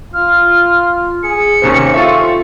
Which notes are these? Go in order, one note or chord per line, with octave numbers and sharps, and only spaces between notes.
F4 F6
G#4 C#7
D#2 C3 C#4 C5
C4 F4 A4 E5 C#6